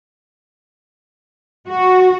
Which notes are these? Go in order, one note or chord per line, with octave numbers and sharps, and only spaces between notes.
F#4